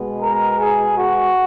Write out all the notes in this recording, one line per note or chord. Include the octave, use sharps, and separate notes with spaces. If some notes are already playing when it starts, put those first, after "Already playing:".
Already playing: B2 G#3 B3
A#4
G#4
F#4